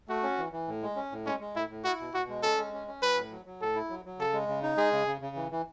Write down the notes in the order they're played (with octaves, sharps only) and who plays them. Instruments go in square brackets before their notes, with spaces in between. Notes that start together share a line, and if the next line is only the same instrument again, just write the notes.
[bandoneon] A3 [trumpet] F#4
[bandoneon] C#4
E3
E3
A2
G#3
C#4
A2
[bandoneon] G#3 [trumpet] C#4
[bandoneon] G#3
[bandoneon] A2 [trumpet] E4
[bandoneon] A2
[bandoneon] E4 [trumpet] F#4
[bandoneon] B2
[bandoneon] B2 [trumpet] F#4
[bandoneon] G#3
[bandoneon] C#4 [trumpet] A4
[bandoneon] G#3
C#4
C#4
[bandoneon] F#3 [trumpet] B4
[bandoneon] A2
F#3
F#3
[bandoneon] A2 [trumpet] A4
[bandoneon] E4
F#3
F#3
[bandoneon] C#3 [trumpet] A4
[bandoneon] G#3
C#3
D#4
[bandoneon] G#3 [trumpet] G#4
[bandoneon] C#3
C#3
C#3
E3
E3